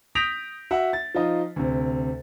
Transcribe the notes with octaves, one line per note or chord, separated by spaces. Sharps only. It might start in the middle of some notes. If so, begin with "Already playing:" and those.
D#6 G6 A#6 B6 D7 F7
F#4 E5 F#5
A6
F3 D#4 F4 D#5
D2 C3